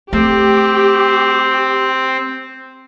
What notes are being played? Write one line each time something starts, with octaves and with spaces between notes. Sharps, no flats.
A3 C4 G4